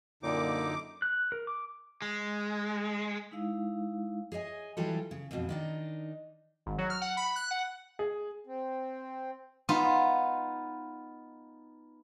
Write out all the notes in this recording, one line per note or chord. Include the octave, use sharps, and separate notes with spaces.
F#2 A#2 D3 D#4 D6
F#6
A#4
D6
G#3
G#3 D#4 E4 F5
G#4 C#5 D#5 G#5
E3 F#3 G3 F4 G4 A4
C#3
F2 G#2 B2 E3
D#3 D4 D#4
G#1
F#3
F6
F#5
B5
F#6
F#5
G#4
C4
B3 D#4 F4